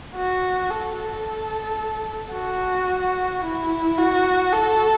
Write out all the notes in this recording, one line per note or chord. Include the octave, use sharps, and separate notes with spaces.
F#4
A4
F#4
E4
F#4
A4